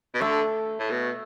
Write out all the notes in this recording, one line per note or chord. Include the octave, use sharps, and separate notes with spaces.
B2
D3 A3
A2
B2